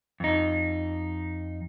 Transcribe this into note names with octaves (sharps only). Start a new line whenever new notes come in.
F2 D#4